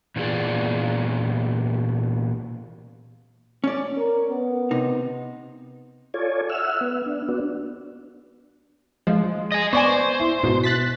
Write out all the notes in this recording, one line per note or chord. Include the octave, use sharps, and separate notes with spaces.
A#2 E3 B3 F4 G#4 D5
C#4 D5
A#4
B3
C3 D#4
F4 A4 C#5 D5 G#5
E5 F#5 E6 F6
B3
D4
B3 D4 F#4
F3 G#3
D#5 G#5
B3 C5 D5 G#5 C#6
E4
G#2 B2
F#6 A6 B6